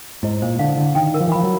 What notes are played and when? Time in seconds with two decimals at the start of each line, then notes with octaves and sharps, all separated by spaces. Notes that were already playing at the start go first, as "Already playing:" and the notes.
0.23 G#2 E4
0.42 A#2 C5
0.59 D3 F5
0.77 D3 E4
0.95 D#3 G5
1.14 A#4
1.20 F3
1.28 E3
1.32 F3 B5
1.43 F#3